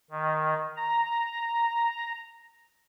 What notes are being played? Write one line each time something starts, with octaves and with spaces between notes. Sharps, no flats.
D#3
A#5